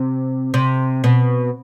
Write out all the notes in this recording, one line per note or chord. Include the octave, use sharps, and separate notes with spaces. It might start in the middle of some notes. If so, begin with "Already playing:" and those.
Already playing: C3
C3
B2